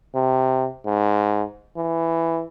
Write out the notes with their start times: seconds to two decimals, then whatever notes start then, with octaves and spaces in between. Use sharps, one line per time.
0.15 C3
0.86 G#2
1.77 E3